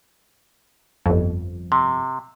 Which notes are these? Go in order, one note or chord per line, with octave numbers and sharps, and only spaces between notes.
G1 F2
C3